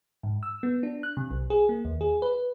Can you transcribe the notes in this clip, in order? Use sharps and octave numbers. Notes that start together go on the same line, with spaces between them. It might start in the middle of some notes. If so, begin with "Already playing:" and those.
G#2
E6
B3
D4
F#6
C3
B1
G#4
A#3
D#2
G#4
B4